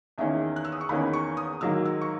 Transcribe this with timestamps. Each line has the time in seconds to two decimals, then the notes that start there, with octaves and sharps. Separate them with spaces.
0.18 E2 D#3 A#3 C#4 E5
0.56 F#6
0.65 E6
0.72 D#6
0.81 C#6
0.89 E2 D#3 A#3 C#4 B5
1.13 C#6
1.37 D#6
1.61 G#2 D#3 F#3 A#3 E6
1.85 E6
2.01 C#6